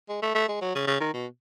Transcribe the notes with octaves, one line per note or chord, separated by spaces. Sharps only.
G#3
A3
A3
G#3
F#3
C#3
C#3
D#3
B2